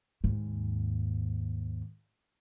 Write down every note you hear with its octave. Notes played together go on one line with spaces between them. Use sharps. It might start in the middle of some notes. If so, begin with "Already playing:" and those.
D#2 G#2